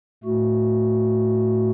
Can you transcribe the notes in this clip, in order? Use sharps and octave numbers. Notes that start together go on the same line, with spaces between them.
A2 A3 F#4